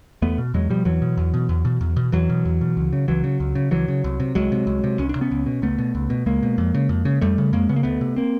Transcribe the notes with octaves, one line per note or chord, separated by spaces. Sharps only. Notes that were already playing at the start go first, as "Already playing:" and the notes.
E2 A3 B3
B2
E2 F#3 G#3
B2 F3 G3
E2 E3 F#3
B2
E2
B2
E2
B2
E2
B2
E2 E3 F#3
B2
E2
B2
C#2
C#3
C#2 E3 F#3
C#3
C#2
C#3
C#2 E3 F#3
C#3
C2
C3
C2 F#3 G#3
C3
C2
C3
C2 C#4
D4
C3
B3 C#4
C#2
B2
C#2 A3 B3
B2
C#2
B2
C#2 G#3 A#3
B2
F2
C#3
F2
C#3
F2 G3 A3
C#3
F2 G#3 A#3
C#3 B3
A#3
D2 A3 B3
C3
A#3 C4